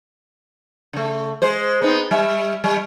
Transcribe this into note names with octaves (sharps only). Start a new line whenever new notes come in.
C#3 A3
G#3 C5
B3 C4 D#4
G3 E5
G3